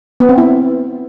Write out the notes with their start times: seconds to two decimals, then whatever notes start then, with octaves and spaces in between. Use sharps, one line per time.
0.20 B3
0.29 C4
0.38 E4